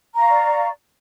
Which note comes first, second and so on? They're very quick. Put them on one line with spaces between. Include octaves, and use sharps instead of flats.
A#5 F5 C#6 D5